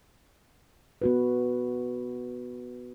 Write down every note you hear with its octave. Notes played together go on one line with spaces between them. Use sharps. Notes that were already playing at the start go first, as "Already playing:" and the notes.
B3 F#4 B4